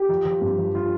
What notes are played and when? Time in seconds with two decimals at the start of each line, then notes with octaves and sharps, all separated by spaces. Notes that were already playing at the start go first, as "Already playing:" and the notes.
Already playing: G4
0.09 F3
0.25 F3
0.41 G2
0.58 F3
0.75 F4